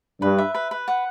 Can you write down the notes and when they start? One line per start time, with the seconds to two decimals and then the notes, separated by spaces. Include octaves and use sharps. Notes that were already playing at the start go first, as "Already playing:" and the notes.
0.21 G2 B4
0.38 E5
0.55 B4
0.71 B4
0.88 F#5